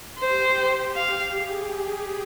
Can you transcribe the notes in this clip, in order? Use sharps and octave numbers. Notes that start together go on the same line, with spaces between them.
G4 C5
F5
G#4